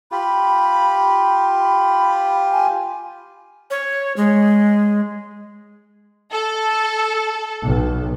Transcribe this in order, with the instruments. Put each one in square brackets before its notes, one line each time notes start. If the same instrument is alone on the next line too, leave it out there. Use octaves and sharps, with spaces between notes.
[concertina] F4 G4 [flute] B5
[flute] B5
G#5
[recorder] C#5
G#3
[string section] A4
B1